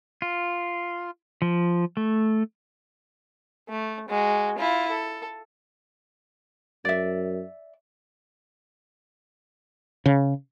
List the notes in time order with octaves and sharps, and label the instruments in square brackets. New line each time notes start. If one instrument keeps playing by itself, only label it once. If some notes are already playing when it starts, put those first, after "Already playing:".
[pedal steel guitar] F4
F3
A3
[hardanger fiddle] A3
G#3 F#4
E4 F4
A4
[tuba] F#2 [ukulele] D5 E5
[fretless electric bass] C#3